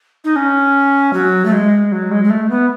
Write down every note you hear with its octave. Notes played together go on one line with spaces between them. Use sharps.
D#4
C#4
F#3
A3
G#3
F#3
G#3
G#3
A3
B3